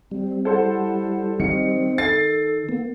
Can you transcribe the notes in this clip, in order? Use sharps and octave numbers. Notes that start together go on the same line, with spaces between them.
G3 C4
E4 A4 C5 F#5
D#3 C4 C#7
A4 A6 C7
A#3 B3